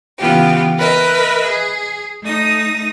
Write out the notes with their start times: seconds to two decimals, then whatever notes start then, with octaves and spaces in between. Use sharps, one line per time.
0.19 C#3 E3 B3 F4 G4
0.78 A#4 B4 D#5 E5
1.44 G#4
2.23 A3 D#4 D#6 A#6